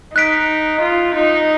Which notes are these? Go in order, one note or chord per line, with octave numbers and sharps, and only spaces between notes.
D#4 F#6 B6 D7
F4
D#4